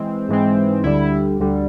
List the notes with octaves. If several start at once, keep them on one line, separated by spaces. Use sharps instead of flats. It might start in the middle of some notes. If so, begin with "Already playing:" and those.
Already playing: E3 G#3 C4
G#2 E3 G#3 C4
D2 D3 G3 E4
D2 D3 G3